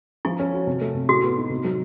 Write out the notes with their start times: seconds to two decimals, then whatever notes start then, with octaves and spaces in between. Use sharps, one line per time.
0.25 F3 E4
0.39 C#4
0.54 F#4
0.67 C3
0.81 A3
0.94 C3
1.09 A2 F#4
1.23 B3
1.37 D#4
1.50 C3
1.64 F#3